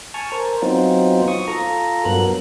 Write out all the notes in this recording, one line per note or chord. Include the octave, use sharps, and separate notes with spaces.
G#5 A5 C#6 F6
A#4 C5
F#3 B3 C4 D#4 F4 C5
C#6 D#6
F4 A4 A#5
G2 F#3 B3 A#4 F#6